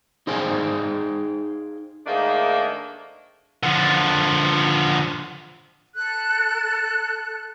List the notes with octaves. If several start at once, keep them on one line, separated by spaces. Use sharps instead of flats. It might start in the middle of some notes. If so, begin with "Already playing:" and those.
D#4 G#4 C5 F5 G5 G#5
G#2 D#3 A3 A#3 D4 D#5
D3 F3
A4 F#6